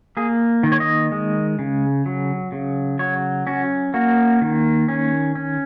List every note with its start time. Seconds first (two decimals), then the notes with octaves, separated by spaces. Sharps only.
0.17 A#3 G#4
0.63 D#3
0.72 C#5
0.80 D#5
1.12 G#3
1.59 C#3
2.06 F#3
2.52 C#3
2.99 F#3 C#5
3.47 C#4 F#4
3.94 A#3 F#4
4.41 D#3
4.88 C#4
5.35 C#4